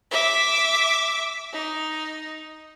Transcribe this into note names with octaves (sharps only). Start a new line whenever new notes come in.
E5 D6
D#4